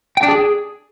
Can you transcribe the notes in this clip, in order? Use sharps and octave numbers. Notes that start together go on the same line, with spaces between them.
G5
D4
G#4